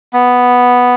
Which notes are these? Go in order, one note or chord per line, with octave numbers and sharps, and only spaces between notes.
B3